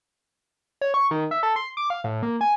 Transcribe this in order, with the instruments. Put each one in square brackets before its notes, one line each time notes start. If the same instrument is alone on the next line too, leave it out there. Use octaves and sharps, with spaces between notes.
[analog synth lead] C#5
C#6
D#3
E5
A4
C6
D6
F5
A2
A#3
G#5